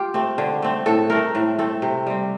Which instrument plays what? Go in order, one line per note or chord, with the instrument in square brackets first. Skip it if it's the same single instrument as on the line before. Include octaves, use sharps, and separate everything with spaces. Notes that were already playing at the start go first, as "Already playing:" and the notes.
Already playing: [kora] F4 G4
A3 C4
D3
A3 C4
A2 A4
A3 C4 A#4
A2
A3 C4 A4
C3
G3 C4